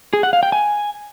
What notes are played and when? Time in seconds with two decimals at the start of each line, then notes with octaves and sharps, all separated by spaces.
0.13 G#4
0.23 F#5
0.33 F5
0.43 G5
0.52 G#5